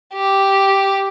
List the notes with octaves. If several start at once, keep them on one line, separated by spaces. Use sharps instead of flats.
G4